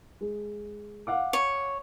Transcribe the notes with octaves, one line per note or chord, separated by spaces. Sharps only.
G#3
F5 F#5 D6
C#5